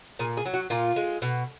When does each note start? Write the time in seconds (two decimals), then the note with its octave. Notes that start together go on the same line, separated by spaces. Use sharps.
0.19 A#2 G#4
0.37 G#4
0.45 F#3
0.54 F#4
0.70 A#2 F4
0.96 G#3
1.22 B2